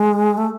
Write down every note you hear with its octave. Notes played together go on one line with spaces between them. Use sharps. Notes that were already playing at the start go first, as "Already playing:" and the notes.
Already playing: G#3
A3